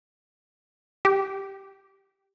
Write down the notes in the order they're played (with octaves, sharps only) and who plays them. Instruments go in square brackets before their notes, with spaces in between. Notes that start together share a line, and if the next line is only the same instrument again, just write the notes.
[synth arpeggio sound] G4